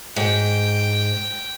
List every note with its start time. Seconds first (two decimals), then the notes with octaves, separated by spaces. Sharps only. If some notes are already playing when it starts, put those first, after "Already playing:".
0.16 G#2 G5